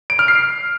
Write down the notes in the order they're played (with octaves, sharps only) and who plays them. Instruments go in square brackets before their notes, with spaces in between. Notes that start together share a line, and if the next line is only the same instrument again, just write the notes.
[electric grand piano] D7
F6
C7